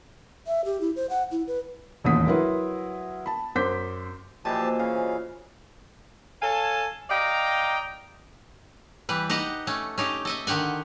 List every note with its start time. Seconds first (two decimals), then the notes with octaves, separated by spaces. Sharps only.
0.47 E5
0.65 G4
0.81 E4
0.96 C5
1.10 F#5
1.31 E4
1.47 B4
2.04 E1 A1 D#2 C#4 D#6 B6
2.27 F#3 E4 A#4 B4 C6
3.26 A5 B5
3.55 F#2 C5 D6 G6 B6
4.45 A#2 E3 F3 F#4 G4 C5 D#5 A5
4.79 C#3 F5
6.42 A4 C#5 F5 G#5 A5
7.10 D5 D#5 F5 G5 A#5
9.09 E3 G3 B4
9.30 D#4 G4 D#5 F#5
9.67 A3 C#4
9.98 C#4 D#4 G4
10.25 A4 D#5 E5
10.47 D3 D#3 G4 F#5 G#5